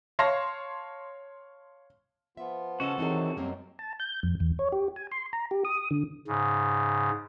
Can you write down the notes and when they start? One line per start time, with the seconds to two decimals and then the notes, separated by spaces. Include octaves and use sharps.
0.19 C#5 F5 A5 C6 A#6
2.37 F3 B3 F4 E5
2.80 C#3 C#4 F#4 A4 D#5
2.98 C3 D#3 E3 F#3 C4 D#4 G#4
3.37 F#2 B2 F#3 G3 A#3 C4
3.79 A5
4.00 G6
4.23 F2
4.40 E2
4.59 C#5
4.72 G4
4.96 G#5
5.11 C6
5.33 A#5
5.51 G4
5.65 D#6
5.91 D3
6.28 G#2 C#3